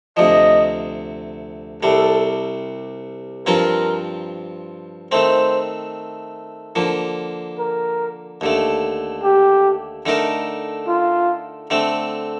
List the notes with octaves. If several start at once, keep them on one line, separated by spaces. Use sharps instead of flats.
D2 C3 F3 D#5
C2 C3 G3 A4
G2 F3 C4 F4 A#4
D#3 A3 C4 C5
D3 F3 A#3
A#4
D#2 D3 A3
G4
D3 A3 D#4 A#4
F4
D3 A3 C4